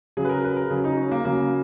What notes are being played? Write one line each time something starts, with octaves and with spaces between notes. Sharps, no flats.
C#3 F#3 G#4
B4
A#4
B4
A#4
C#3 F#3 G#4
D#4
C#4
A#3
C#3 F#3 A#3